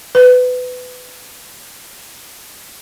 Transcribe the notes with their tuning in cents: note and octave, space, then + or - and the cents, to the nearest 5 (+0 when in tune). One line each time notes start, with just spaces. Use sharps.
B4 +25